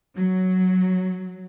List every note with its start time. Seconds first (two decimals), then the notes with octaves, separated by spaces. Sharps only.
0.16 F#3